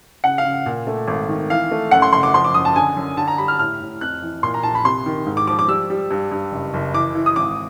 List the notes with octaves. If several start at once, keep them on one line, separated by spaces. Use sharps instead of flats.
C#3 F#5
F5
C#3
A#2
A3
G#1
D#3
E3 F5
A3
F#2 F#5
C6
F#1 C6
D6
F3 C6
D6
F#2 D#6
A5
D3 G#5
F#2
D3 A5
A#5
G3 B5
F6
A2 F6
A2
F2 F#6
E3
A#2 C6
A#5
A#1 A5
B5
C3 C6
D#3
G#2
D6
F3 D6
D6
G3 E6
G3
G2
G2
F#1
F#1
E3 D6
E3
D#6
G#1 D6